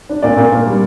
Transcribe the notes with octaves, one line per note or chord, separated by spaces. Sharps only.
D4
A#2 D5
A#2
A#3
G3